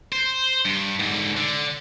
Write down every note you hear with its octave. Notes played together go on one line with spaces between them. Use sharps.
C5
G2
G#2 D3
D3